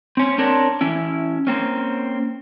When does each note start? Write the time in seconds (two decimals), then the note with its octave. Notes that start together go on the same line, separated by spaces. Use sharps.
0.17 C4 C#4
0.38 C4 D4 A#4 C#5
0.81 E3 C#4 E4
1.47 A#3 C4 C#4